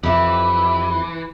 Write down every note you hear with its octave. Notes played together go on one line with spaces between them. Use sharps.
F2 E3 G4 E5 B5